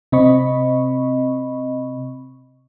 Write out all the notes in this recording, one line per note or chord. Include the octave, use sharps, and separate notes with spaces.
C3 C4 D#5 B5 C#6